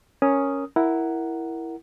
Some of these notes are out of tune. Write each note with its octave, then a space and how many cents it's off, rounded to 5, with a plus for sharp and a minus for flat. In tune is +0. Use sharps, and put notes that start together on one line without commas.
C#4 +0 A#4 +0 D#6 +0
E4 +0 A#4 +0 F#5 +5